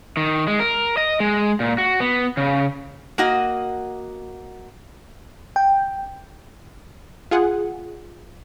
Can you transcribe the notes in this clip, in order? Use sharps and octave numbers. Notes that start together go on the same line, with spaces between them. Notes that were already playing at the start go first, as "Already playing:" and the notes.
D#3
G#3
A#4
D#5
G#3
A#2
F#4
B3
C#3
A#3 F#4 D#5
G5
F4 G#4 F#5